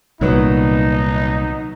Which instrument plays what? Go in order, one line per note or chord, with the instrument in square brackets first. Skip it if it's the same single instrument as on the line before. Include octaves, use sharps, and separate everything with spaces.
[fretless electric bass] C2 A#2 [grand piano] D#3 F#3 B3 [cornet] D#4